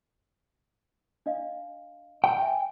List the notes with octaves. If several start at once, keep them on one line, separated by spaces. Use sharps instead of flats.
D4 D#5 F5
G5
E5 G#5